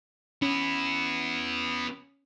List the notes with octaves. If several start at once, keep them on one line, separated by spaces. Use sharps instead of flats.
B3 C#4 E4